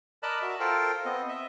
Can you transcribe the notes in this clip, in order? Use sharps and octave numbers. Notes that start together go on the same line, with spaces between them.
A#4 D5 D#5 A5 B5 F#6
F#4 A#4 E5
F4 A4 A#4 C5 G5
B3 C4 D#5
D#5 E5